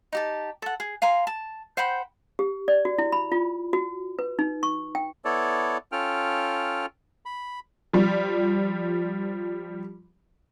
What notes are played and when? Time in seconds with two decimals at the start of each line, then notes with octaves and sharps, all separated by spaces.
0.13 D#4 G4 A5
0.62 A4 F#5
0.80 G#4
1.02 F5 G#5 A#5 C6
1.27 A5
1.77 C5 F#5 G5 B5
2.39 G4
2.68 D5
2.85 F#4
2.98 E4
3.12 B5
3.32 F4
3.73 F#4
4.19 B4
4.39 D#4
4.63 C#6
4.95 G5
5.25 B3 E4 A4 C#5 D5
5.92 C#4 F4 A4 G5 F6
7.26 B5
7.93 F3 G3